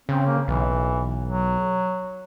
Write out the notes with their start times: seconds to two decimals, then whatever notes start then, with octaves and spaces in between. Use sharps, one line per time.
0.09 C#3 C4
0.26 A#3
0.48 B1 E3
1.28 F#3